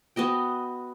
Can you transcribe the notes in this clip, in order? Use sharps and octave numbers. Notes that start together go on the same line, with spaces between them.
B3 F#4 D#5 G5